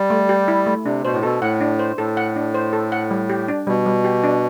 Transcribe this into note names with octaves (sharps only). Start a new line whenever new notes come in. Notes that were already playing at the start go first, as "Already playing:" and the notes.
Already playing: G3
A3
G4
E4
A3
C3 D4
B2 C5
A2
B2 A4
A2 F#5
D4
C5
A2 A4
F#5
D4
C5
A4
F#5
G3
G4
D4
B2 G3
G3
G4
D4